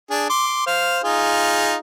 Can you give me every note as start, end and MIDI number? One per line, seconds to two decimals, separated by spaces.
0.10 0.27 62
0.10 0.27 68
0.30 0.63 84
0.30 0.63 86
0.66 0.99 72
0.66 0.99 77
1.04 1.75 63
1.04 1.75 65
1.04 1.75 68